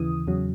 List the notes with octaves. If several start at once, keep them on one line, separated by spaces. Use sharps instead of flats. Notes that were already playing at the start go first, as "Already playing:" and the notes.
Already playing: D#2 C#3 E3 D#6
E2 C#3 F#3